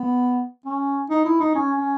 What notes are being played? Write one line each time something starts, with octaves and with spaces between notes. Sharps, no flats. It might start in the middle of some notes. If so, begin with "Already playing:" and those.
Already playing: B3
C#4
D#4
E4
D#4
C#4
C#4